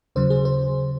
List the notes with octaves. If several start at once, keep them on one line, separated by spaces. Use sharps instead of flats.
D#2 C#3 F#3 C5
G#4
C5